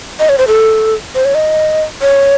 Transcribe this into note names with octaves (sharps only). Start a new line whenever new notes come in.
D#5
C#5
C5
A4
C5
C#5
D#5
C#5